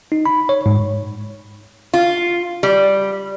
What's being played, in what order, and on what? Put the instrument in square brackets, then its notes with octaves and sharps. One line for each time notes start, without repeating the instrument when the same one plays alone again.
[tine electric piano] D#4
B5
C#5
G#2
[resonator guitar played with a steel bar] F4
G3